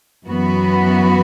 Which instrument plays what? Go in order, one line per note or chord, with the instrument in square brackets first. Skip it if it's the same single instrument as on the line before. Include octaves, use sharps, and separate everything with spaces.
[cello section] F#2 E3 B3 F#4 B4